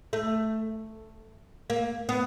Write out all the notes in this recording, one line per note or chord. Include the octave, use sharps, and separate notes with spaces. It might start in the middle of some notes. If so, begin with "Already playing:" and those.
A3
A#3
B3